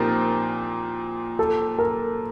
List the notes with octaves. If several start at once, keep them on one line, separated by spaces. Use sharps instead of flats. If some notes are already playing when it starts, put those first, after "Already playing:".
Already playing: A#2 F3 C4 D#4 G4 A#4
A4
A#4